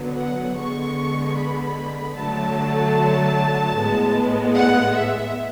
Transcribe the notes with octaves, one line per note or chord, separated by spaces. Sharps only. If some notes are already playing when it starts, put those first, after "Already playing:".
Already playing: D3 F#3 B3
F#5
D3 G#3 B3 C#6
B5
D3 F#3 A3 A5
A2 G#3 B3
F#5
E5